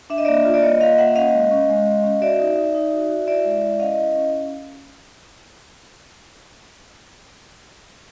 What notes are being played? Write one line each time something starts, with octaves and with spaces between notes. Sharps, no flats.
D4 E5
D#5
A#3 D5 E5
F4
D5
A#3 C#5 D#5
F4 D#5 F5
A#3 E5 F#5
C#4 D#5 F5
G#3
C#4
G#3
G#3
C#4
F#4 D5 E5
D#4
D#4
D#4
F#4
F#4
E4 D5 E5
G#3
E4
C#4 D#5 F5
E4
C#4